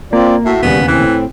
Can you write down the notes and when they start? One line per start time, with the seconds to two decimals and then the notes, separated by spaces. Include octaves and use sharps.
0.13 A#3 C4 F4 D5
0.46 A2 F#4 E5
0.63 E1 D#2 C#3 G3 B3
0.88 A2 E3 C4